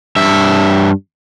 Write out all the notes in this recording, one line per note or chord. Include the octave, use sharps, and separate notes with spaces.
G2 E5